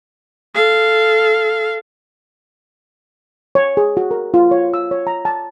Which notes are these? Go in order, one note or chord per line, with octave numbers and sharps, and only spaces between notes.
A4 F5
C#5
G#4
F#4
A#4
F4
C#5
E6
C#5
A#5
A5